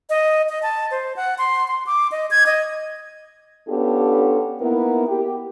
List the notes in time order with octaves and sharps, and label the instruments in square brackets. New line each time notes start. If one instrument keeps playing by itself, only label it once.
[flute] D#5
D#5
A5
C5
F#5
C6
C6
D6
D#5
G#6
D#5
[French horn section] B3 C#4 D4 F4 G4 A4
A#3 B3 D#4 E4 A#4
G4